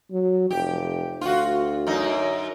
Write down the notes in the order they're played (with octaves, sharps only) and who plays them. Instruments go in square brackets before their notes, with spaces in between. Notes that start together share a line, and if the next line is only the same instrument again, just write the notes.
[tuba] F#3
[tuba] F1 [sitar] G4
[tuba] D2 [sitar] F4 F#4
[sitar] F#2 D#4